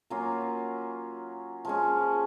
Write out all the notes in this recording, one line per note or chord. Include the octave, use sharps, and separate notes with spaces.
F#3 A#3 C#4 F4
F3 G#3 C#4